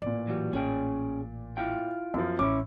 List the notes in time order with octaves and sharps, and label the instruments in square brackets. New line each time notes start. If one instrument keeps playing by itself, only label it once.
[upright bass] A1 [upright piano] A#2 D5
[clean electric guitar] E3 F#3 G3
[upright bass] A1 [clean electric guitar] C#4 G#4 G5
[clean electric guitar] E4 F4 G5
[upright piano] F#2 F3 [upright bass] B3
[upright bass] A1 [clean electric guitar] C#4 E4 [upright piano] D6